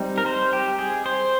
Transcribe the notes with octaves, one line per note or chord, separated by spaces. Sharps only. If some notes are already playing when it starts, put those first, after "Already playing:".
Already playing: G3 C4 D#4
A#4
C5
G4
G#4
C5